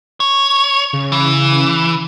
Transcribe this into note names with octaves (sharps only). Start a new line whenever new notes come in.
C#5
C#3
E3